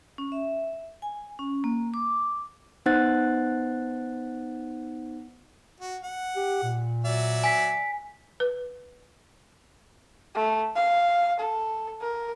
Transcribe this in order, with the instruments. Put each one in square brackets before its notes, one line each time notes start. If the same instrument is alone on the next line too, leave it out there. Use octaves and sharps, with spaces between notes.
[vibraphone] C#4
E5
G#5
C#4
A#3
D6
[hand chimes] B3 D#4 C5 F#5 F#6 A6
[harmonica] F#4
F#5
[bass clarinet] G4
A#2
[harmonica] F#3 D5 E5
[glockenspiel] G#5 B6
[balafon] B4
[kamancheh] A3
F5
A4
A#4